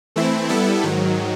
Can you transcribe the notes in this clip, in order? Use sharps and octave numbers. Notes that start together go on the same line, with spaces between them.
E3 A3 C4 E4
G3 B3 E4 A4
G#2 D#3 F#3